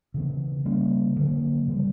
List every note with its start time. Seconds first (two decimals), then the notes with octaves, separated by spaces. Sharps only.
0.14 C#3 E3 B3
0.66 C#3 G3 A#3 C#4
1.16 D3 F#3 A#3
1.68 C#3 E3 G3